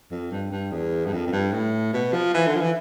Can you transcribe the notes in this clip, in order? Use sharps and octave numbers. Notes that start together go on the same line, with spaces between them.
F2
G2
G2
E2
G2
F2
F2
G2
A2
B2
F3
E3
D3
F3
E3